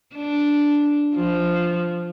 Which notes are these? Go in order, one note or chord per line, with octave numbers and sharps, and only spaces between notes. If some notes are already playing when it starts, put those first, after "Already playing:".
D4
F3